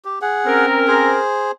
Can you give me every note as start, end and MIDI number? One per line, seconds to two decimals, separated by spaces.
0.05 0.19 67
0.22 0.66 68
0.22 0.66 78
0.46 1.20 60
0.46 1.20 61
0.46 1.20 70
0.87 1.51 68
0.87 1.51 72